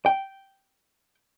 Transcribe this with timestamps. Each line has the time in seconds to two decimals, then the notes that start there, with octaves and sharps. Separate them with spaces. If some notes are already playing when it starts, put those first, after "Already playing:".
0.06 G5